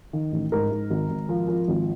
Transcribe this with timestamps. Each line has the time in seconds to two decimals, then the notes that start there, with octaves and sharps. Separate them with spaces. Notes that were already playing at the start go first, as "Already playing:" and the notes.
0.13 D#3
0.32 A1
0.52 G#2 A#4
0.71 G#2
0.90 G#1
1.10 G#1
1.29 F3
1.48 F3
1.68 G#1